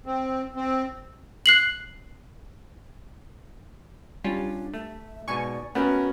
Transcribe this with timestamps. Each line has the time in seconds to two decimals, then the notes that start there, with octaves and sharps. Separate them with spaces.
0.06 C4
0.55 C4
1.46 F#6 C7 F#7
4.24 G3 C#4 D4 F4
4.74 A3 E5
5.28 G#2 B2 D5 G#5 C#6
5.75 A3 B3 C#4 F#4 A#4